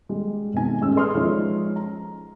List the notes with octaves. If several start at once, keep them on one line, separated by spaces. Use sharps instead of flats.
G3 G#3
G#1 G#2 B2 G#5
A1 G#3 C#4 G4 E6
G#4 B4 D5 C6 D#6 F6
F3 G#3 C#4 D#4 C#5 E5
A#5